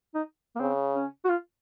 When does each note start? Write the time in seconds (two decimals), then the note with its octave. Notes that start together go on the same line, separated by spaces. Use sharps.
0.15 D#4
0.56 A#3
0.60 C#3 C4
0.95 C#4
1.25 F#4
1.29 F4